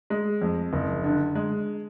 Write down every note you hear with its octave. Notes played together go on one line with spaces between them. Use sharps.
G#3
F2
F#1
D3
G#3